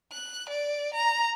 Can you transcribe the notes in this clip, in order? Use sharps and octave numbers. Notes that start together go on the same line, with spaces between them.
F#6
D5
A#5